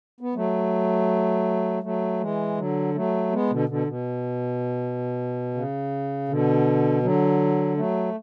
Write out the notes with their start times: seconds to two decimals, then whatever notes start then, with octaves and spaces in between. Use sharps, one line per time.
0.21 B3
0.35 F#3 A3
1.83 F#3 A3
2.20 E3 G#3
2.57 D3 F#3
2.95 F#3 A3
3.32 G#3 B3
3.50 B2 D3
3.69 B2 D3
3.87 B2
5.54 C#3
6.29 B2 D3
7.03 D3 F#3
7.77 F#3 A3